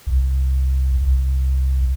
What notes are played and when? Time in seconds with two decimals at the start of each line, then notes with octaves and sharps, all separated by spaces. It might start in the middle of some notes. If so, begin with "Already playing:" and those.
0.07 C2
1.02 C2